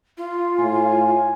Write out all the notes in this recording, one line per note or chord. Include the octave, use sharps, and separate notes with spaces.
F4
A2 G#5